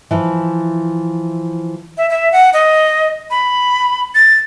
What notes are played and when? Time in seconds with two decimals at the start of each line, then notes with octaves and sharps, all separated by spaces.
0.11 E3 F3
1.97 E5
2.10 E5
2.32 F#5
2.53 D#5
3.30 B5
4.15 A6